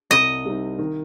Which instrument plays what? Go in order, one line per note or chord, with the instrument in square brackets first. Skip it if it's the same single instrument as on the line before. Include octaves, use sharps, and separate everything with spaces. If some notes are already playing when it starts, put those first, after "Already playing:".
[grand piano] C2 [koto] D#5
[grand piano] C3 G3 C4 D#4
D#3